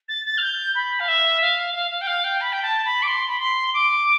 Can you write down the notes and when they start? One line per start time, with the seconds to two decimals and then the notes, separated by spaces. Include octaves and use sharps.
0.08 A6
0.25 A6
0.38 F6
0.42 G6
0.75 B5
1.00 F5
1.08 E5
1.41 F5
1.75 F5
1.91 F5
2.01 G5
2.07 F5
2.24 G5
2.41 B5
2.53 G5
2.63 A5
2.85 B5
3.03 D6
3.07 C6
3.28 B5
3.40 C6
3.74 D6